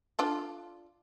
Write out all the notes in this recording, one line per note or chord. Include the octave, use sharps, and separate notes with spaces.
D4 F4 A4